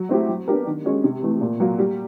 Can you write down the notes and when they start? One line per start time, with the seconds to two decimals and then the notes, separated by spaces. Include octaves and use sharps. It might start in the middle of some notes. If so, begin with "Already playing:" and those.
Already playing: F#3
0.09 A3 C4 E4 G4
0.29 F#3
0.48 B3 D4 G4 A#4
0.67 D#3
0.84 G#3 C#4 F#4
1.04 C3
1.23 E3 A3
1.41 A#2
1.60 F#3 A#3
1.79 G3